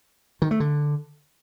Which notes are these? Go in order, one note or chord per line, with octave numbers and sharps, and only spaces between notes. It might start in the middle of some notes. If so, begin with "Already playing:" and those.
D#3
A3
D3